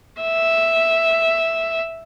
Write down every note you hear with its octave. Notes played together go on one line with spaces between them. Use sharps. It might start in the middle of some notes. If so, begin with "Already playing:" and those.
E5